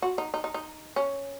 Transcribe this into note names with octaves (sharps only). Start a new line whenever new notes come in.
F#4
D#4
D#4
D#4
D#4
C#4